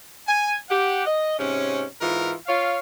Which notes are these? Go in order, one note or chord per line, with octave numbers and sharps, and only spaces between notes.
G#5
G4 F#5
D#5
G#2 C3 C#4
G#2 E3 F4 A#4
F4 C#5 F5